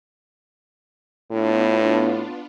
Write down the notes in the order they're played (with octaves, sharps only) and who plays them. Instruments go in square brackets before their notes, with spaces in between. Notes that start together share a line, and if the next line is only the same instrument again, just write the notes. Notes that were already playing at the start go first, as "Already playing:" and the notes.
[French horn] A2 [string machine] B3 D4 F4